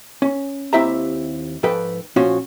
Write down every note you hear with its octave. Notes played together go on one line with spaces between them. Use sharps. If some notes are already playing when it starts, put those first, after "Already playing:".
C#4
D#2 C4 E4 G4 E5 A#5
G#2 F3 A4 B4 G5
A#2 F3 C#4 F4 F#4